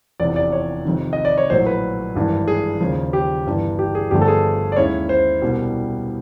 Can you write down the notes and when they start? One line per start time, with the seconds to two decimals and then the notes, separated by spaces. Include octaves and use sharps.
0.20 F1 E2 C3 D5
0.36 D5
0.52 C#5
0.85 F2 C3 D#3
1.13 D#5
1.25 D5
1.38 C#5
1.50 A#1 A2 F#3 C5
1.66 B4
2.15 G#1 G2 E3
2.48 G#4
2.81 D#2 C#3 F3
3.13 G4
3.46 G1 G2 E3
3.79 G4
3.95 G#4
4.11 G1 G2 D3 F3 A3 G4
4.22 A4
4.28 G#4
4.72 D5
4.76 D#2 D#3 G#3 C#4 E4 C#5
5.09 C5
5.42 C2 B2 G3